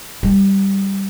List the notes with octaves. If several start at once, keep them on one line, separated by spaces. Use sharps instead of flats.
G3